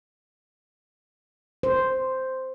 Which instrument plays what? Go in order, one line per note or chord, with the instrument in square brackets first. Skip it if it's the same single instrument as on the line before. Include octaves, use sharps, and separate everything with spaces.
[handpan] C5